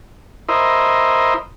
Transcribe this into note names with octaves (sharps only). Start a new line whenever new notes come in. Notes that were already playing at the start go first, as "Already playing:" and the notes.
E4 A#4 C5 D#5